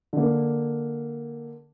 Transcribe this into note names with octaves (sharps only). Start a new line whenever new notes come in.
D3 A#3